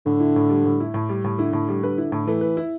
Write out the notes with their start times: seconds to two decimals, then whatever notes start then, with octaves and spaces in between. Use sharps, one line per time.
0.06 A2 D3
0.20 E4
0.36 A2
0.50 G3
0.66 A2
0.80 E4
0.94 A2
1.09 G3
1.24 A2
1.38 D3 E4
1.53 A2
1.68 G3
1.83 D3 B4
1.98 E4
2.12 A2
2.27 E3 A3
2.41 B4
2.57 E4